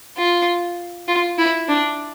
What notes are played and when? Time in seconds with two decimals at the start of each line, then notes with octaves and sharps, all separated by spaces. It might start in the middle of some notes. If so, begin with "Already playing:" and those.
0.17 F4
1.08 F4
1.38 E4
1.68 D4